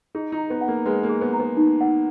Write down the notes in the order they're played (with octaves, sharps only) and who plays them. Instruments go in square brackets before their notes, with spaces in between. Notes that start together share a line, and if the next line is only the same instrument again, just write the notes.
[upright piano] D#4 [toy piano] G#4
[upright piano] D#4
[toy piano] A#5
[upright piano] B3
[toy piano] F#5
[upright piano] A#3
[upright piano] G#3 [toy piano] B4
[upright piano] A#3
[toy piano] G#4
[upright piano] B3
[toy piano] A#5
[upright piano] B3
[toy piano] D#4
F#5